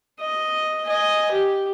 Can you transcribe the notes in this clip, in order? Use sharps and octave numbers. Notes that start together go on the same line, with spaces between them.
D#5
D#5 G#5
G4